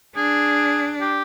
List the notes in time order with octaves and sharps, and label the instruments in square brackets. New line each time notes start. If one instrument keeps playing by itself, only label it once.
[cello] D4 [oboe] G#4
[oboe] G4